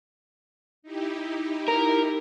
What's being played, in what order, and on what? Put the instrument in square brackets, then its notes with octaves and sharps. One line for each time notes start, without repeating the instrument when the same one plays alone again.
[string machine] D#4 E4 G4
[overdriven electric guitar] A#4